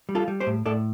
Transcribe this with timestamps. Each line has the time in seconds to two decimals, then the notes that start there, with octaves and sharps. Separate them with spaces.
0.09 G3
0.15 F4 A4
0.28 G3
0.40 G4 C5
0.47 A2
0.66 A2 A4 D5